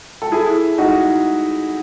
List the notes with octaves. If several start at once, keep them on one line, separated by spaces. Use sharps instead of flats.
A4
E4 G#4
D#4 F#4